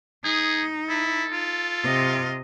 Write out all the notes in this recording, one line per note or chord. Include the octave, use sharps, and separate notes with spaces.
D#4 G#4
E4 A4
F4
C3 D#5